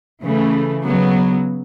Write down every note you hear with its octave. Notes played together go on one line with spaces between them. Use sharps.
C#3 E3 A3
C#3 F#3 B3